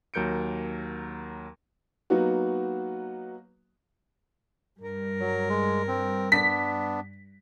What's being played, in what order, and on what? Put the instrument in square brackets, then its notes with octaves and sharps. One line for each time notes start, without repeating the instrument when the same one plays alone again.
[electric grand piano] D#2 F#3 A#4 G6 C#7 D7
[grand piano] F#3 A#3 B3 D#4 F#4
[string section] G2 [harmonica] A#4
[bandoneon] F#3
G#3
C4
[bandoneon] B3 D4 [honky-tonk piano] B6